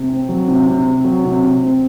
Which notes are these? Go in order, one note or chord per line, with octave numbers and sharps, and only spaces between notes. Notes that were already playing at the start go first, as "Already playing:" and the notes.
Already playing: C3
C4
F#3
C3
C3
C4
F#3
C3
C3
C4